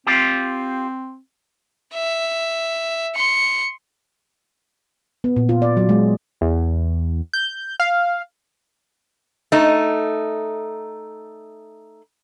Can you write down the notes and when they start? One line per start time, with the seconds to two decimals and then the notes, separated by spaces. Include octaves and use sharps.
0.07 C4 F4 G4
1.94 E5
3.16 C6 C#7
5.24 B3
5.36 A#2
5.49 F4
5.62 D5
5.77 F#3
5.89 G#3
6.41 E2
7.33 G6
7.80 F5
9.52 A3 D#4